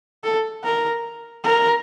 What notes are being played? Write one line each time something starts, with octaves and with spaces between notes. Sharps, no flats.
A4
A#4
A#4